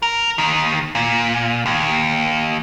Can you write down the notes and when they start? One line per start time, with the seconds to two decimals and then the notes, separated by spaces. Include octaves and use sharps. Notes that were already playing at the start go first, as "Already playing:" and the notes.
0.02 A#4
0.38 D#2 D#3
0.95 A#2
1.66 D#2